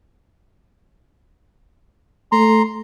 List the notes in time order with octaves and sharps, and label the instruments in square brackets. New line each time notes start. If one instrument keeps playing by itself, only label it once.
[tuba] A3 [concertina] A#5 C6